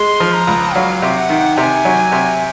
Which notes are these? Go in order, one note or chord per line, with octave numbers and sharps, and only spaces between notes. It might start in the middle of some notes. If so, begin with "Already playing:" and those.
Already playing: G#3 C6
F3
A#5
C#2
F#3 F5
C3
F#5
D#3
C3 G#5 A#5
F#3
C3